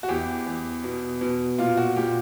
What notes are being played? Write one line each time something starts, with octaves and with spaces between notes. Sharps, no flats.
F#4
E2 G4
E2
B2
B2
A#2 F4
F#4
A#2 G4